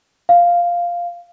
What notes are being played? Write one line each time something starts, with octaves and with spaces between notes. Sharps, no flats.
F5